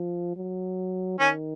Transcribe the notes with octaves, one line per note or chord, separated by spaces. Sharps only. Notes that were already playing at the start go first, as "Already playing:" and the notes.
Already playing: F3
F#3
D#3 C#4